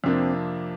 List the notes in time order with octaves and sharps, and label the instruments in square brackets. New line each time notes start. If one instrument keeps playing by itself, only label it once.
[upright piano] F2 C3 F3 A#3 D4 [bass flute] C4